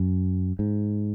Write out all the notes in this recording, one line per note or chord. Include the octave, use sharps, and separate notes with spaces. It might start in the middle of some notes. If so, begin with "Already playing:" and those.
Already playing: F#2
G#2